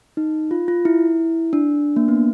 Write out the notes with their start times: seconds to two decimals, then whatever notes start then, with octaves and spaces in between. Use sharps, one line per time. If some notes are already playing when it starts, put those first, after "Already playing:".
0.17 D#4
0.51 F4
0.68 F4
0.85 E4
1.53 D4
1.96 A#3
2.08 B3